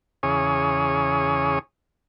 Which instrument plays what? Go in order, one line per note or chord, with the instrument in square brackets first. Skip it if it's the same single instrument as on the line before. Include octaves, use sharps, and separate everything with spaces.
[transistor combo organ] E2 C#3 G#4 C#5 D#6